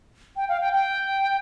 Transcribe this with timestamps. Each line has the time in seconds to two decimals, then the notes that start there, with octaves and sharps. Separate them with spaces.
0.36 G5
0.49 F5
0.61 G5
0.73 G5